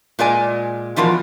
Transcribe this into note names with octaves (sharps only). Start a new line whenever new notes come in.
A#2 G#3 D5 G#5
B2 E3 F3 F4 F#4 A#4